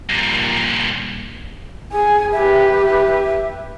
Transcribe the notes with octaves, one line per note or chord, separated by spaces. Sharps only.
G2 A#2
G#4 G#5
G4 B4 E5
E5